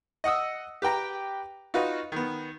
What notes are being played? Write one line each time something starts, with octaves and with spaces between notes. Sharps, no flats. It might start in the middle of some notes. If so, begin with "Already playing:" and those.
D#5 F#5 D#6 E6
G4 B4 G5 A#5
D#4 F4 F#4 B4 D#5
D#3 B3